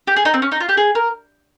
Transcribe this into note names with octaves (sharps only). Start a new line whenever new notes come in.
G4
G#4
D#4
C4
C#4
D#4
F4
G4
G#4
A#4